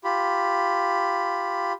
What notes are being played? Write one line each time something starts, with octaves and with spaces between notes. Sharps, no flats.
F4 G4 B5